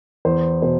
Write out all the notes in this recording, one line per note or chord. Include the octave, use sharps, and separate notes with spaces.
E2 C5
B2 C5